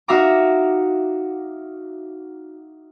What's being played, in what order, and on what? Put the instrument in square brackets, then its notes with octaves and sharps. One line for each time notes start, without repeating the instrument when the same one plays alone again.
[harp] D#4 F#4 E5 F5 A#5 D6